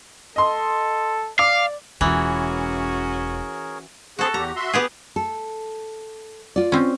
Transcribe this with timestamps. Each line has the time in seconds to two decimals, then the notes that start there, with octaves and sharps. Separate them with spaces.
0.36 A4 D#5 C6
1.39 D5 F5 D6
2.01 E1 E3 C#4 F4 F#4 G#4 A#4 C#5
4.19 C4 F#4 G#4 A4
4.34 E2 G4 A#5
4.56 F#4 E5 C6
4.73 B3 G4 G#4
5.16 A4
6.56 F4 D5
6.72 C4 C#4